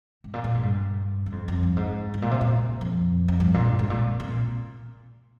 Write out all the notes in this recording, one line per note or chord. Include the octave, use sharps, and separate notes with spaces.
G#2
A#2
A#2
G#2
G2
G2
F2
F2
G2
G#2
G#2
A#2
C3
A#2
F2
F2
G2
A#2
G2
G#2
A#2
C3
A#2